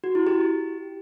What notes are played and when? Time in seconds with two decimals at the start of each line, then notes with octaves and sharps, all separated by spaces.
0.04 F#4
0.15 E4
0.27 G4